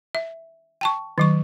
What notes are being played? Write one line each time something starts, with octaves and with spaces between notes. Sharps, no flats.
E5
G5 A5 C#6
D#3 F#3 C#6